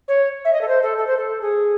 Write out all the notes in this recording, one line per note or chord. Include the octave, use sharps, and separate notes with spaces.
C#5
E5
D#5
A4
C5
A4
A4
C5
A4
G#4